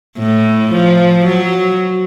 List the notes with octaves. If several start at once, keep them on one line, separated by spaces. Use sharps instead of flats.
A2
F3
F#3